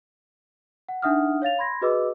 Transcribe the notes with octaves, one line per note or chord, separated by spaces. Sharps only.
F#5
D4 D#4 E5 F#5 D#6 F6
C#5 F5 A6 F7
B5 C6 G#6 A#6
F#4 G#4 B4 D#5 D6 E6